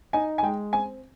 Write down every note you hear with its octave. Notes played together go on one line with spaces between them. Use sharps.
D#4 G#5
G#5
G#3 G5
C4 G#5